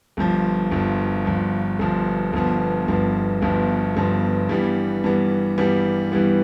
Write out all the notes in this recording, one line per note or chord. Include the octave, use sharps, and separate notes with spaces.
G1 G2 F3
G1 G2 F3
G1 G2 F3
G1 G2 F3
G1 G2 F3 B3
G1 G2 F3 B3
G1 G2 F3 B3
G1 G2 F3 B3
G2 E3 G3 B3
G2 E3 G3 B3
G2 E3 G3 B3
G2 E3 G3 B3